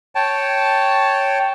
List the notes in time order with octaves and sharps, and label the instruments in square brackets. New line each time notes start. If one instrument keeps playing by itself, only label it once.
[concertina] C#5 G5 A5